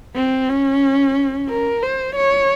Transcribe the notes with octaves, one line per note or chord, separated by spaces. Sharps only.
C4
C#4
A#4
C5
C#5